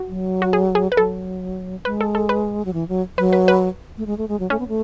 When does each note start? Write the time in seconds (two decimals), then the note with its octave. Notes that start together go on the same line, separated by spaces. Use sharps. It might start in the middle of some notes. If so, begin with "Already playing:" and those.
Already playing: F#4
0.08 F#3
0.42 F#4
0.53 G#4
0.75 G#4
0.92 B4
0.97 F#3 A4
1.85 G#3 B4
2.01 A4
2.15 A4
2.29 B4
2.65 F#3
2.74 E3
2.89 F#3
3.18 F#3 B4
3.33 B4
3.48 B4
3.98 A3
4.06 G#3
4.18 A3
4.28 G#3
4.40 F#3
4.50 A3 C#4
4.59 B3
4.68 A3